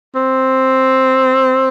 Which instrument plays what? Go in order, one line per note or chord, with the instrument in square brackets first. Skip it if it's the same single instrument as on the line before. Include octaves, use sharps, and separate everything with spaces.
[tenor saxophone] C4